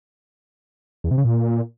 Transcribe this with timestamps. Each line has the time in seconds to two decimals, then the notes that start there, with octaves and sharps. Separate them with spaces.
1.04 E2
1.11 C3
1.18 C#3
1.24 A#2